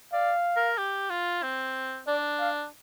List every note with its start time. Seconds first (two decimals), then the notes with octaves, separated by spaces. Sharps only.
0.13 D5 F5
0.56 A#4
0.78 G4
1.10 F4
1.43 C4
2.07 D4 D5
2.40 F5